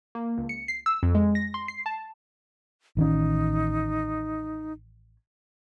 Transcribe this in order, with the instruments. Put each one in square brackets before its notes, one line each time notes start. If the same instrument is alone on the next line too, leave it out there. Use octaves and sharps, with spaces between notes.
[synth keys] A#3
C#2
C#7
C7
E6
F2
G#3
A#6
C6
C7
A5
[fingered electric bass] A1 D#3 C#4 [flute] D#4